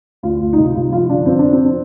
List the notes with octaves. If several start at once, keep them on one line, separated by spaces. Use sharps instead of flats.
D2 F4
D2
D#4
C2 F4
C2 F4
F3 F4
G1 D4
F2 C4
F2 D4
C4